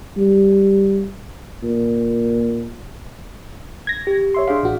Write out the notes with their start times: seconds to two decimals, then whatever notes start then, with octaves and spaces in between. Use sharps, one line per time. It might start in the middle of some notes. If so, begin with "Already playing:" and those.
0.17 G3
1.63 A#2
3.87 G#6 A#6
4.07 G4
4.34 C#5 E5 C6
4.48 D4 G#4 F5
4.63 A1 F#4